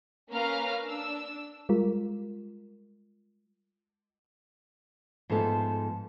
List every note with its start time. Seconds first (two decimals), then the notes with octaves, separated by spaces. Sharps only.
0.31 A#3 C#4 B4 F5 A#5 F6
0.84 D4 E6
1.69 G3 G#3 F4 A#4
5.30 G#2 F3 A3 B3 A4 A5